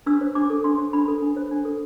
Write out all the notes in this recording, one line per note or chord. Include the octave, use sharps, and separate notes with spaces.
D4 E6
C5
D4 D6
A4
D4 C6
C5
D4 B5
A4
D4
C5
D4
A4